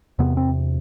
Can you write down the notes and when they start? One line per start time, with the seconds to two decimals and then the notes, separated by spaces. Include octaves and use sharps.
0.19 E2 C3 B3
0.37 C4